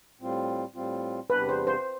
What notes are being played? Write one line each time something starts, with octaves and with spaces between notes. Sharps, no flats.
A2 G3 C4 F4
A2 G3 C4 F4
E2 C3 G3 B3 D4 B4
C5
C5